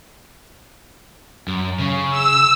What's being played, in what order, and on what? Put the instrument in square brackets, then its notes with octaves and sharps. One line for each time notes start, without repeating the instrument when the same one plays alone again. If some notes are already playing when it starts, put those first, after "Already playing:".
[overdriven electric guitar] F#2
C#3
[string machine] E6